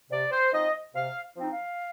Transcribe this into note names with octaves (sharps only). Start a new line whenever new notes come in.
C3 D5
C5
F3 C4 D#4 D#5
C3 F5
F3 C4 D#4
F5